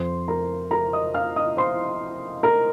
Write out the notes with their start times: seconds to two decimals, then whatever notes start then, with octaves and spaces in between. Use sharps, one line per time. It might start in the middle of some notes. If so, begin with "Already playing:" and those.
Already playing: F2 F3 C5 C6
0.28 A#4 A#5
0.71 A#4 A#5
0.93 D#5 D#6
1.14 F5 F6
1.36 D#5 D#6
1.57 C5 C6
2.43 A#4 A#5